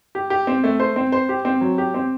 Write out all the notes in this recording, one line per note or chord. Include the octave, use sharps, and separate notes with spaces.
G4
G4
C4
A3
C5
C4
C5
G4
C4
F#3
G4
C4